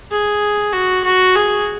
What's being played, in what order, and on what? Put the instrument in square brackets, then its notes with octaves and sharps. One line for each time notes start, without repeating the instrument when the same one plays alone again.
[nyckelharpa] G#4
F#4
F#4
G#4